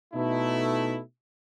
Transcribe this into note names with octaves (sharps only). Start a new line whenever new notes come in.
B2 A3 D#4 E4